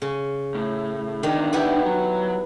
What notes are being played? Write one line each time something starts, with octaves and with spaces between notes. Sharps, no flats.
C#3
A2
E2 D#3 D4
B3 E4 G4
F#3